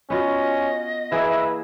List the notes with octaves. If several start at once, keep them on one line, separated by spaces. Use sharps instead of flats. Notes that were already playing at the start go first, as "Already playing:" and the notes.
B3 C#4 F4 F#4 D#5
E3 A#3 G#4 B4 E5